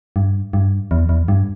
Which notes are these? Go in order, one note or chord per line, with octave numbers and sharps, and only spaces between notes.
G2
G2
E2
E2
G2